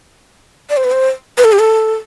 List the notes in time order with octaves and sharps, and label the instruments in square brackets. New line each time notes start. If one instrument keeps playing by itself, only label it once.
[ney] D5
C5
B4
C5
B4
A4
G4
A4